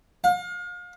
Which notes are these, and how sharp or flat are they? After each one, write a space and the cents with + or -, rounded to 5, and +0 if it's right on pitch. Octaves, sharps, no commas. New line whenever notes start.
F5 +35